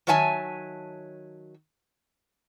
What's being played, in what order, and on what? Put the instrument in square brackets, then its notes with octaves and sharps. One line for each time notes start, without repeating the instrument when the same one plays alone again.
[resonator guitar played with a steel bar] D#3 F#3 C#5 E5 G#5 A5